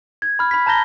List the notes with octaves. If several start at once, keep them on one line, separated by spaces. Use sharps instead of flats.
G#6
B5 F6
B5 B6
A5 A#5 G6 A#6 G7